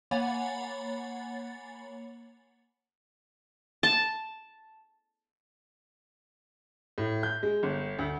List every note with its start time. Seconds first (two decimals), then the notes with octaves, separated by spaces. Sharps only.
0.11 A#3 C#5 F#5 G#5 B5 A6
3.83 A5
6.98 A2
7.23 G6
7.43 G#3
7.63 G1
7.99 D2